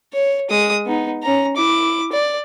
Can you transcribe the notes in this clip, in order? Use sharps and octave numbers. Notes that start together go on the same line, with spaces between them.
C#5
G#3 D#6
B3 D#4
C#4 A#5
E4 D6
D5